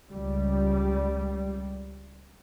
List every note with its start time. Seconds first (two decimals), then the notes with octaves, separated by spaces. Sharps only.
0.13 C#2 G3